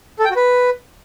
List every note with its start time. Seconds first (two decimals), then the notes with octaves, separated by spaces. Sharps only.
0.19 A4
0.25 G5
0.31 F#4
0.36 B4